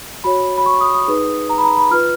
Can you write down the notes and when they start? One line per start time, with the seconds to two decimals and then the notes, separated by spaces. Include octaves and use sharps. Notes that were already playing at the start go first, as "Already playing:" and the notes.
0.24 F#4 C#5 B5
0.58 B5
0.66 C#6
0.81 D#6
0.94 D#6
1.08 D#4 G#4 B4
1.50 A#5
1.58 B5
1.64 A#5
1.77 B5
1.91 F4 B4 F6